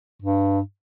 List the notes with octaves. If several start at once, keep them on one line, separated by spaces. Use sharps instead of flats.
G2